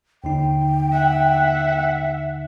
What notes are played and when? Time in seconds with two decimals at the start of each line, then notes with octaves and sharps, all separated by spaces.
0.24 D#2 D3 D#4 G5
0.92 E5 F#5